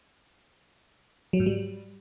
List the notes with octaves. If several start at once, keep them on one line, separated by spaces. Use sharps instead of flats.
F#3
G#2
G3